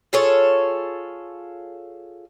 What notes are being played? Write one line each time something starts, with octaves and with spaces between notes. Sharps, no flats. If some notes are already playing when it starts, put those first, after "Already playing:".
F4 G#4 A4 C#5